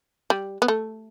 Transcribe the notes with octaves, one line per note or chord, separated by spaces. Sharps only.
G3
B3
A3